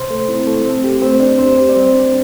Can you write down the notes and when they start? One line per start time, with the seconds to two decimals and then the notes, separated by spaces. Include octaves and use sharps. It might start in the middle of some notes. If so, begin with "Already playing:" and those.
Already playing: C3 C5 C6
0.10 A3 A4
0.28 C4 E4
0.46 A3 A4
0.65 C4
0.84 G4
1.02 A3 C4 C5
1.20 D4 D5
1.38 E2 C4 C5
1.57 G4
1.69 D5
1.75 G3 C4 C5
1.94 D4 D5